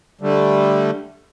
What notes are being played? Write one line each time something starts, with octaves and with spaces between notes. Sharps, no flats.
D3 G3 A3